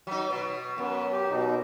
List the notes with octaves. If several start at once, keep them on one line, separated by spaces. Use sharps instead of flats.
F#3 D#4
B2
F#2 B3
G4
B2 D#4